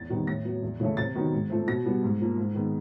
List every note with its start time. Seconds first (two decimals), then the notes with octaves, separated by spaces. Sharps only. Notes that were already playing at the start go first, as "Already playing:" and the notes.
Already playing: E2 A6
0.10 C3 D#3 G3 B3
0.27 A2 A#6
0.44 F#3 B3
0.62 E2
0.80 C#3 E3 A3
0.97 C3 A6
1.15 D#3 F#3 B3
1.32 G#2
1.50 F3 A3 C4
1.67 B2 A#6
1.86 G3 B3
2.03 G#2
2.20 F3 A#3
2.38 G#2
2.55 D#3 G#3 B3